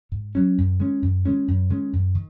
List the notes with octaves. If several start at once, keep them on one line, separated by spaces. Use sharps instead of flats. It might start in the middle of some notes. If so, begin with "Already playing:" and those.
G#2
F#3 C#4
F#2
D#3 G#3 C#4
F#2
D#3 G#3 C#4
F#2
D#3 G#3 C#4
F#2
D#3